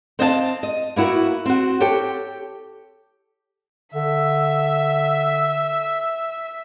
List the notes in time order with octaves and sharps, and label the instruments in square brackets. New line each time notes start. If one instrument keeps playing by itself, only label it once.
[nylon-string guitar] C4 C5 D#5 F5 F#5 A5
D#5
A#3 B3 E4 F#4 A#4
C4 F#4
G4 A4 C#5 G5
[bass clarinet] D3 [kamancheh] E5